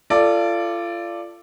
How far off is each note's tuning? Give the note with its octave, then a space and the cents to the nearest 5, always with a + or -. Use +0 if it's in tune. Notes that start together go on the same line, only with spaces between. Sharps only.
F4 -30 A4 +10 D5 +0